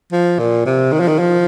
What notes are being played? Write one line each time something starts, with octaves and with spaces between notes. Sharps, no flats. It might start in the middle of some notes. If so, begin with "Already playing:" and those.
F3
A#2
C3
D#3
F3
D#3
F3